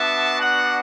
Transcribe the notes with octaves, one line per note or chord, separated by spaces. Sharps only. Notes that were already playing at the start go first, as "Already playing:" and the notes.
Already playing: B3 D4 F#4 E5 A5
D5 F#5